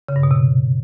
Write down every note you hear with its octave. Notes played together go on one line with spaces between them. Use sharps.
C#3
G2
B2
C3